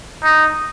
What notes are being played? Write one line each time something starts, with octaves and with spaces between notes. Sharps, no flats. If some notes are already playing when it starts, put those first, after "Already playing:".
D#4